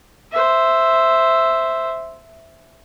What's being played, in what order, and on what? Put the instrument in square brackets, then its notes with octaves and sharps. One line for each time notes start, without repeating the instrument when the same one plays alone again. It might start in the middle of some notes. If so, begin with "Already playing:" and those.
[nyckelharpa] C5 E5